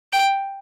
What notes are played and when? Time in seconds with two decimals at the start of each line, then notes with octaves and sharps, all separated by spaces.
0.13 G5